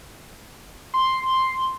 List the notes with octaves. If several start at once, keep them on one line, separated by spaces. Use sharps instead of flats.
C6